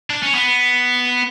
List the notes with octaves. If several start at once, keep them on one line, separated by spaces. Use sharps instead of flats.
D4
C#4
B3